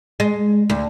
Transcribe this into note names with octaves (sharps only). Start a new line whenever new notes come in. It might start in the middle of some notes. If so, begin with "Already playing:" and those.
G#3
D2